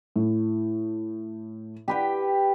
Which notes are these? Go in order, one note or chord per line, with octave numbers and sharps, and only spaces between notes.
A2
G4 B4 G5